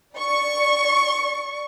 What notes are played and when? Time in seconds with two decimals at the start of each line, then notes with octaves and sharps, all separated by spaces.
0.18 D5 C#6